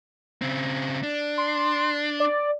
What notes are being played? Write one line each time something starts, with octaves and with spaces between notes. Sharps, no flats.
C#3 C4
D4
C6
D5